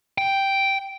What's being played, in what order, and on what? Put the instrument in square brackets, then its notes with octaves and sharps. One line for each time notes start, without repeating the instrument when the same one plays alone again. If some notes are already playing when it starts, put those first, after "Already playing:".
[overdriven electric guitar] G5